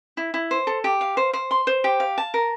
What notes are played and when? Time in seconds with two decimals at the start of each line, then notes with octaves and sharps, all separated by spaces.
0.17 E4
0.34 E4
0.51 C5
0.67 A4
0.84 G4
1.01 F5
1.17 C5
1.33 C5
1.51 C6
1.67 C5
1.84 G4
2.00 F5
2.18 A5
2.34 A#4